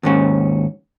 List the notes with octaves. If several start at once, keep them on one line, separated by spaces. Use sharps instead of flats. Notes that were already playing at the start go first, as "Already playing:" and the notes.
D#2 G#2 C#4